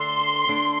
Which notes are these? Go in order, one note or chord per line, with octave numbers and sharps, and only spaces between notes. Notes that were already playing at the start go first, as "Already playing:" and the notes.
Already playing: D3 A3 D4 C6
D3 A3 D4